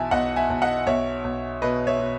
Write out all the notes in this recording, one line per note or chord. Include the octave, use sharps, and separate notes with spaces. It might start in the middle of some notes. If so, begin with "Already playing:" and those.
Already playing: B1 E3 E5 G#5 A5
B1 D#5 F#5
E5 G#5
B1
D#5 F#5
B1 C#5 E5
B1
B2 B4 D#5
C#5 E5
B2